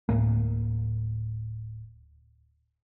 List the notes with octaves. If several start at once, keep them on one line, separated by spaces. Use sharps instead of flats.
D1 E2 A2 A#3